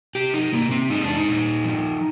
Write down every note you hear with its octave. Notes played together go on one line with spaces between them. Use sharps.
C3 G4
D#4
C3 A#3
C4
G#3 D#4
D4
D#4
A#2
F3